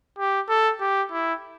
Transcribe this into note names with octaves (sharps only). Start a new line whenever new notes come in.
G4
A4
G4
E4